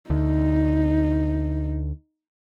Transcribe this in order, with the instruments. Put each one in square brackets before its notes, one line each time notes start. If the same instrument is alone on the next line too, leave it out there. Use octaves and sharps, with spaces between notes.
[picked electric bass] D2 [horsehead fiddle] D#4